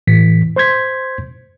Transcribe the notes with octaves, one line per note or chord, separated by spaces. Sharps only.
A2 E3 B6
C5 C6 G6 G#6 B6